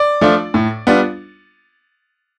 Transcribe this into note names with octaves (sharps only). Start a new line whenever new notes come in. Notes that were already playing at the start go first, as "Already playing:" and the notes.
Already playing: D5
F3 A3 D4 F4
A2
G3 B3 D4 F4